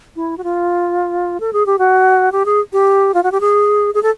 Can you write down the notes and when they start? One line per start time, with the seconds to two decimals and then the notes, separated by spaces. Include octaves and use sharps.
0.16 E4
0.37 F#4
0.44 F4
1.40 A4
1.53 G#4
1.66 G4
1.78 F#4
2.32 G4
2.46 G#4
2.73 G4
3.14 F4
3.23 F#4
3.32 G4
3.40 G#4
3.94 G#4
4.03 A4